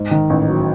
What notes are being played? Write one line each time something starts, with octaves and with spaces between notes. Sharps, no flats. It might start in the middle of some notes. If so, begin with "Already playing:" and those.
Already playing: G#2
D#3
A1
F#3